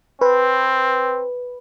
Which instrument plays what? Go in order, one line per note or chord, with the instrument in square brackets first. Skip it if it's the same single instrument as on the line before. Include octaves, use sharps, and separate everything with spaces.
[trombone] C4 [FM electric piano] B4